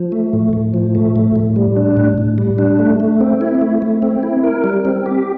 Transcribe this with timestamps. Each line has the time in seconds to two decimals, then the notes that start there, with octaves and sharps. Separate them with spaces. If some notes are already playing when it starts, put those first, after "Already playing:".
Already playing: F3
0.12 A3
0.33 A2
0.53 A2
0.74 F3
0.95 A3
1.16 A2
1.36 A2
1.56 G3
1.76 D4
1.97 A2
2.18 A2
2.38 G3
2.58 D4
2.79 A3
3.00 A3
3.21 C4
3.41 E4
3.61 A3
3.82 A3
4.02 C4
4.23 E4
4.44 A#4
4.64 G3
4.85 C4
5.06 G4